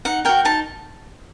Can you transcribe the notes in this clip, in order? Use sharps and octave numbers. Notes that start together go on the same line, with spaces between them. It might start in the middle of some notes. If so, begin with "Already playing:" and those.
D#4 F#5
F#4 A#4 G5
D#4 A5